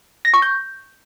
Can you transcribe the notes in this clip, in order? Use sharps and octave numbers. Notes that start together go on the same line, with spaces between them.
A#6
C#6
G6